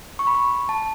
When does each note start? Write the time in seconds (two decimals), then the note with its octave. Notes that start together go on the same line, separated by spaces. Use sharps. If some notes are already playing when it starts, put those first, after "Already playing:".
0.19 C#6
0.27 B5
0.35 C#6
0.69 A5